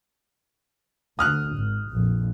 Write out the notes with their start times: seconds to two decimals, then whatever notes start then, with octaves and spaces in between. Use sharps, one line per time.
1.19 D2 D#6 F6 F#6
1.57 G#1
1.89 A#1 F2